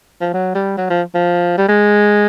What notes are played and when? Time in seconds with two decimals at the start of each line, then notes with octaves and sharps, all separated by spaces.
0.21 F3
0.34 F#3
0.55 G3
0.78 F#3
0.90 F3
1.15 F3
1.58 G3
1.69 G#3